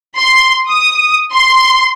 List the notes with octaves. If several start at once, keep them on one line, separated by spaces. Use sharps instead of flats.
C6
D#6
C6